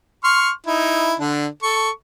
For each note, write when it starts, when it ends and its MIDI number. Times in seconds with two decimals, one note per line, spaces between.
0.24 0.50 84
0.24 0.50 85
0.24 0.50 89
0.66 1.14 63
0.66 1.14 64
1.20 1.47 50
1.20 1.47 62
1.63 1.90 69
1.63 1.90 85